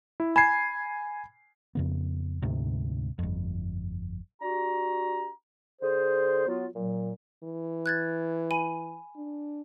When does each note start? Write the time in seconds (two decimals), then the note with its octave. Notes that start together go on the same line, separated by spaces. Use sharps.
0.20 E4
0.36 G#5 B5 G#6 C7
1.75 F2 C#3 B3
2.42 D2 G#2 C3
3.19 G1 F2
4.42 D4 F#4 G4 A#5
5.82 D3 G#4 C5
6.48 F#3 B3 F4
6.75 A#2 F#3
7.43 E3
7.86 F#6 G#6 A6
8.51 G#5 B5 D#7
9.17 D4